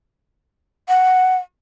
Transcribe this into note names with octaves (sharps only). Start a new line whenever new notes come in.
F#5